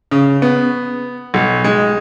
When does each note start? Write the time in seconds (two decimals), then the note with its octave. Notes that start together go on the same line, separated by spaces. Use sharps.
0.11 C#3
0.42 B3
1.34 B1
1.64 G#3